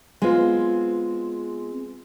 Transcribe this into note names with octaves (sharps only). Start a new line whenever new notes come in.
G#3 B3 C4 F4